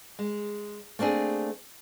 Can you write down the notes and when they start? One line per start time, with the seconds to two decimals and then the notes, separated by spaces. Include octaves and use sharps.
0.19 G#3
0.99 A3 A#3 C4 D4 G#4